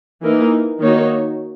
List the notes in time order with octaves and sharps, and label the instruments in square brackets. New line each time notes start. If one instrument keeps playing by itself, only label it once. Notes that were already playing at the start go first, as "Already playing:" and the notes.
[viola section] E3 A#3 D#4 A#4
D#3 A#3 D#4 F#4 C#5